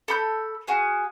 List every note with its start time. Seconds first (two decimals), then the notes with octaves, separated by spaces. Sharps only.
0.08 A4 B5 G6
0.67 F#4 G#4 F5